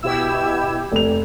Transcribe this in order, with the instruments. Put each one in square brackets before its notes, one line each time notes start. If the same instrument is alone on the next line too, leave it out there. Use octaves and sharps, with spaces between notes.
[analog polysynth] B2 E4 E6 [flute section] G4 G#6
[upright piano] F1 F7